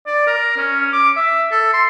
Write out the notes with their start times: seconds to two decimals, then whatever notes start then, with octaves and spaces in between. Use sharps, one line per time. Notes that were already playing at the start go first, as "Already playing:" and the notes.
0.06 D5
0.27 A#4
0.57 C#4
0.92 D6
1.16 E5
1.51 A4
1.73 C6